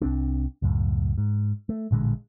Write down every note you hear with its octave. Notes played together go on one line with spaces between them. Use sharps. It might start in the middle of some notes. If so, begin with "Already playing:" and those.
C2 C4 D4
C#2 F#2 A2
G#2
A3
A1 A#2 D3 G#3